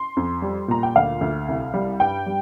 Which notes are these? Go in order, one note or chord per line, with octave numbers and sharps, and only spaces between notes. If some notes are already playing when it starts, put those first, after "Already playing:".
Already playing: C6
F2
G3
A#2 A#5
G5
D2 F5
D2
C2
G3
G2 G5
G3